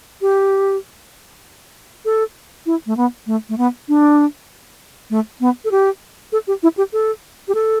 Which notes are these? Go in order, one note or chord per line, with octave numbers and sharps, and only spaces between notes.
G4
A4
E4
A3
B3
A3
A3
B3
D4
A3
B3
A4
G4
A4
G4
E4
G4
A4
G4
A4